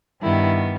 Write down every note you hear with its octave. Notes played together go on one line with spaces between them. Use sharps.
G2 D#3 G3 B3 E4